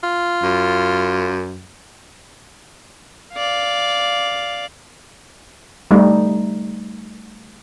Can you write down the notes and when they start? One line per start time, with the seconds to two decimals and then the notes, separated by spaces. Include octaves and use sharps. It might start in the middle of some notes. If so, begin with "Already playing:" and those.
0.03 F4
0.43 F#2
3.34 D5 F5
5.91 G3 A3 D#4